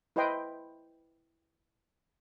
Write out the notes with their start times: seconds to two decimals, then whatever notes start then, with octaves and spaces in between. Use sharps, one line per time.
0.16 E4 B4 C5 D#5 G5 C6